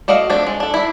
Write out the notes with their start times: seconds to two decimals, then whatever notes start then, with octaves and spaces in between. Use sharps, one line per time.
0.08 A3 F#4 D5 D#5 F5
0.30 F3 A3 C4 D4
0.46 G#3
0.60 D4 A4
0.74 D4 E4